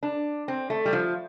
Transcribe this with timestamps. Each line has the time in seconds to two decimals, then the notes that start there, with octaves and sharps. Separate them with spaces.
0.03 D4
0.48 C4
0.70 A3
0.85 G3
0.93 F3